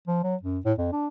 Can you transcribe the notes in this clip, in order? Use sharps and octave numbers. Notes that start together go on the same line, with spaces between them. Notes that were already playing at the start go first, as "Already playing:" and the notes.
F3
F#3
F#2
A2
F2
D4